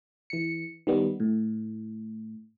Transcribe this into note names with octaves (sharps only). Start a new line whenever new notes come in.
E3 C#7
D#3 G3 B3
A2